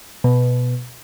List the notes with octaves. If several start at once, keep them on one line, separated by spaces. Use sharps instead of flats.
B2